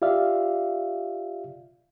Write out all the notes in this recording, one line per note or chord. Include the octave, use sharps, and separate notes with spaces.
F4 G4 D5 E5 F5